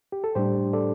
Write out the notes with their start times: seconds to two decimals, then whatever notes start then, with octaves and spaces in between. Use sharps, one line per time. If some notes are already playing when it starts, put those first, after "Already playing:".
0.12 G4
0.24 A4
0.35 A2 G3 D4 G4 C5
0.73 A4 D5